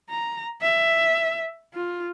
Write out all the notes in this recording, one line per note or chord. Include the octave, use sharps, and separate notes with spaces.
A#5
E5
F4